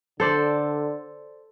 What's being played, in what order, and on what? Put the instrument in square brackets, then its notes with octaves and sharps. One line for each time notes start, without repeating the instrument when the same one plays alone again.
[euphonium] D3 [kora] A4 C5 D5